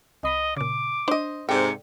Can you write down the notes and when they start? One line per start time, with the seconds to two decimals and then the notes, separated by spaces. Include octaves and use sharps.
0.23 C2 D#5 B5 B6
0.56 A#2 C#3 D6
1.08 D4 C5 D#5
1.49 G#2 C3 A4 D5 G5 C#7